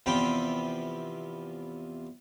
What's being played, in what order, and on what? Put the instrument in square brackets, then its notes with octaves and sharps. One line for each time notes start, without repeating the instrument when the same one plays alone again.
[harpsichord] E2 C3 F3 G5 B5